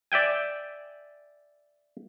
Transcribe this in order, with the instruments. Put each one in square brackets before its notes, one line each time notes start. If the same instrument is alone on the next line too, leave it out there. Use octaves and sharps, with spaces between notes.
[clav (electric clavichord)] D5 E5 G5 G#5